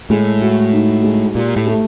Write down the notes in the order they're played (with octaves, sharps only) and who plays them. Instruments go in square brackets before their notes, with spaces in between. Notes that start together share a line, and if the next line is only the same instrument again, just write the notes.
[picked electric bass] A2 [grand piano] G#3
[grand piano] F#4
D#4
G#3
[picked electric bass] A#2 [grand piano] G4
[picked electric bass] A2
[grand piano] A3